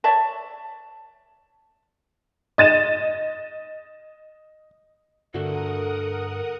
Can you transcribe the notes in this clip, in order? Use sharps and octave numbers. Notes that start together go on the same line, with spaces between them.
C#5 D5 E5 A5
D#5 A6 D#7 E7
G2 D3 A3 F#4 A4 A#4 F#5 D#6